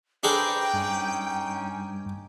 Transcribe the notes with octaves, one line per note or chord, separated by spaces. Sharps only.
D4 G#4 A4 B4 C5 G5 A#5
G2 C#4 D#4 G#5